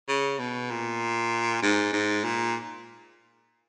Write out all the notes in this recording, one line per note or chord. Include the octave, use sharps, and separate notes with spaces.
C#3
B2
A#2
G#2
G#2
A#2